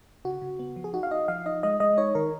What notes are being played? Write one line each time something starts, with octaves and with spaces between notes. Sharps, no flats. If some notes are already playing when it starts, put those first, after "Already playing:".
C#3 F#4
C#3
B3
F3
G#4
D#4 F#4
F5
D#4 D#5
F3 F5
D#4 D#5
G#3 D#5
G#3 D#5
D#4 C#5
D#3 A#4